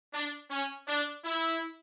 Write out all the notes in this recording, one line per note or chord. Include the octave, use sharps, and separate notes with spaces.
D4
C#4
D4
E4